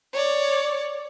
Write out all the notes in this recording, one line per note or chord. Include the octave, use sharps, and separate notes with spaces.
C#5 D5